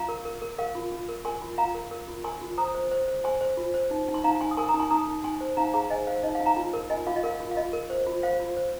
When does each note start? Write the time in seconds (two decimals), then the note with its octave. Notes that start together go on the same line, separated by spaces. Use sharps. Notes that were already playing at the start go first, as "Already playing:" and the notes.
Already playing: F4 F5 A#5
0.09 A#4
0.25 A#4
0.42 A#4
0.58 A#4 F5
0.75 F4
0.92 F4
1.09 A#4
1.25 A#4 G#5 C6
1.41 F4
1.58 F4 F5 A#5
1.75 A#4
1.91 A#4
2.08 F4
2.24 A#4 G#5 C6
2.41 F4
2.57 C5 A#5 D#6
2.75 C5
2.91 C5
3.08 C5
3.24 C5 G#5 C6
3.41 C5
3.57 F4
3.74 C5
3.91 D#4
4.08 D#4
4.14 C6
4.24 D#4 F5 A#5
4.41 D#4 G#5 C6
4.51 D#6
4.57 A#4 G#5 C6
4.69 A#5 D#6
4.74 D#4
4.79 G#5 C6
4.90 D#4 A#5 D#6
5.08 D#4
5.24 D#4 G#5 C6
5.41 C5
5.57 D#4 F5 A#5
5.74 G#4 F5 A#5
5.90 C5 D#5 G#5
6.07 C5 F5
6.23 D#4 D#5
6.35 F5
6.40 D#4
6.46 F5 A#5
6.57 F4
6.73 A#4
6.90 F4 D#5 G#5
7.07 F4 F5
7.16 D#5
7.24 A#4 F5
7.40 F4
7.51 F5
7.57 F4 D#5
7.73 A#4
7.90 C5
8.06 F4
8.23 C5 F5
8.40 F4
8.57 C5